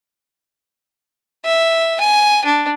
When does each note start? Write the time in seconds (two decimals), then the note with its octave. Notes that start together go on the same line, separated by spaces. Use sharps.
1.45 E5
2.00 G#5
2.45 D4